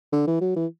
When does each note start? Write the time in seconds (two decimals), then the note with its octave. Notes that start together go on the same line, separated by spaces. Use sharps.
0.12 D3
0.27 E3
0.41 F#3
0.56 E3